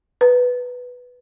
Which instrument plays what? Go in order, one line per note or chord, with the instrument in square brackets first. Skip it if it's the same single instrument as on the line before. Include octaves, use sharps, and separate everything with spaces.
[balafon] B4